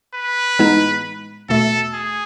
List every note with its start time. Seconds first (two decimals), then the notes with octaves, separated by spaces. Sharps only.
0.14 B4
0.59 A2 E3 G#3 B3 D#4
1.49 E2 B2 A3 A4
1.94 G#4